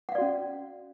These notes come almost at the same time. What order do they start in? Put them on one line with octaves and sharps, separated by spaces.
F#5 F5 D5 F#4 C#4